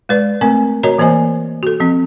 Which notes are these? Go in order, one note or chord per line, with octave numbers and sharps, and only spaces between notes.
G#3 B4 D5
A3 C4 A#4 G#5
F#4 A#4 C#5 D#5 A#5
E3 A#3 C5 D#5 G#5
F#4 A4
F3 C4